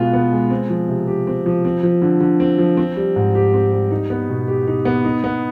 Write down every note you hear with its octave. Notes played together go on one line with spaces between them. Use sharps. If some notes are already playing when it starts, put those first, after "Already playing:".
Already playing: B2 G#3 B3 F4
B3
G#3
C4
F3
C3
G4
C4
F3
C4
F3
D3
D3
C4
F3
C4
G3
G#2
G4
C4
G3
D#4
B3
B2
G4
D#4
B3
D#4
B3